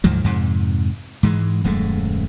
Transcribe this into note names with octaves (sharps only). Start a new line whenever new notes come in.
D2 G#2 F3 F#3
F2 G#2 C3
G#2 E3 G#3
D#1 F#2 G#3 A3